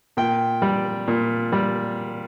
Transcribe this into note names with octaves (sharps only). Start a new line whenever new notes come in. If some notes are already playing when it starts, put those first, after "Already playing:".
A#2 G5
G3
A#2
G3